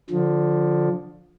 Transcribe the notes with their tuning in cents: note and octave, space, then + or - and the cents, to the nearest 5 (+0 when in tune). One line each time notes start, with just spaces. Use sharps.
D3 +0 F3 +15